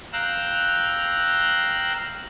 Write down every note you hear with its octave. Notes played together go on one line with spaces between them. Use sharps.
F5 G5 A#5 E6 F#6